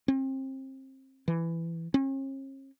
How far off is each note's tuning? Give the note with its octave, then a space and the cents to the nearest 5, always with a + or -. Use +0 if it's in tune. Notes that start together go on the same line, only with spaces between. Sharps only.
C4 +30
E3 +15
C#4 -45